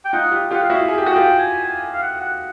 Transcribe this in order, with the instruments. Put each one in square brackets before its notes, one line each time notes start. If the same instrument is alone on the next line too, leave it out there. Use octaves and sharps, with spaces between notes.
[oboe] G5
[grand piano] D#4 F4 [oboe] F#5
[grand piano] F4 G4
[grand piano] F4 G4 [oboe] F#5
[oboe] F5
[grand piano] E4 F#4
G#4
G4
F#4
[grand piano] F4 G4 [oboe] G5
[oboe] G#5
G#5
F5
F#5
F#5